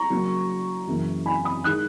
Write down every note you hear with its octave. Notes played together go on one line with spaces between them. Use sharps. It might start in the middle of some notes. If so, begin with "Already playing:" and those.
Already playing: A#5 C#6
C#3 F#3 A#3
F#2 C#3 E3 A#3
G#5 B5
B5 D#6
D#3 G#3 D#6 F#6